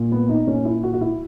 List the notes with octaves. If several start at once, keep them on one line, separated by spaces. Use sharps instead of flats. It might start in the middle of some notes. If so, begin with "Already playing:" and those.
Already playing: A#2
B3
D#4
A#2 C#4
E4
F#4
F#4
E4